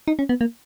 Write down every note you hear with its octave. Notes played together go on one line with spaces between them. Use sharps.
D#4
C#4
B3
A#3